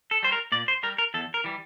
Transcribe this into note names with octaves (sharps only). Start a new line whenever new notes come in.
A4
G3 C5
A#4
A#2 D5
C5
G3 A#4
A#4
E2 A4
A#4
E3 G3